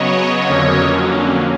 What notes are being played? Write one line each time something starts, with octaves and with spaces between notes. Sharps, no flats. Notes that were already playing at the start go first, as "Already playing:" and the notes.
Already playing: C#3 F#3 B3 C#5 D#5
F2 D3 F#3 A#3 C#4